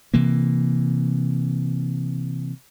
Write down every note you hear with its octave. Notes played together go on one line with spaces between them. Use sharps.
C3 E3 A#3